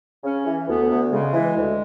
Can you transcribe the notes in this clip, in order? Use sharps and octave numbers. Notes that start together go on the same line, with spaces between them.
C#3 C#4
E3
D2 B3
D2
C#3 G#3
E3
D2